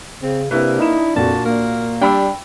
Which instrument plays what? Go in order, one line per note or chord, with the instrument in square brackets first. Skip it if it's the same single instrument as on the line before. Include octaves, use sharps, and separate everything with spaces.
[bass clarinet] C#3 [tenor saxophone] C4
[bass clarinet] C3 [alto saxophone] A#3 [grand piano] C4 E4 B4 [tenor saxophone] D4
[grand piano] D#4 E7 [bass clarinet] E4
[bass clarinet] F2 [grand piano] A#2 F#4 [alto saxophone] A5
[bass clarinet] A#3 [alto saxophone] A#4
[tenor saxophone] G3 [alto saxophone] D4 [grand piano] G5 B5 E6